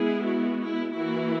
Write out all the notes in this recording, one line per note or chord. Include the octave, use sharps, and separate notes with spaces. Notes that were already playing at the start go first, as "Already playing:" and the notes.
Already playing: G#3 B3 E4 G#4
F#4
E4
E3 A#3 E4 F#4